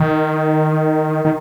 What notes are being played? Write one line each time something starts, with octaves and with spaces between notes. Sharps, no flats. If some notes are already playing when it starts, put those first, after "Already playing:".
Already playing: D#3
D#3